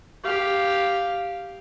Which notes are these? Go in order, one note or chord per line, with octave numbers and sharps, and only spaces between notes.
G4 F5